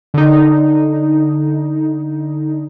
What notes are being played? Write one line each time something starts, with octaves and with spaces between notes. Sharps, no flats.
D3 D#4